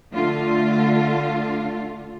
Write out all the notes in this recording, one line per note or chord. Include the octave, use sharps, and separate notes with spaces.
D3 A3 F4